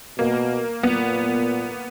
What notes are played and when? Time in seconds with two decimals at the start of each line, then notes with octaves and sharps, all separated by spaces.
0.18 B2 A#3
0.83 A#2 B3